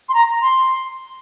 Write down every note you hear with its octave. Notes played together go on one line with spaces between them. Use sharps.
C6
A#5
C6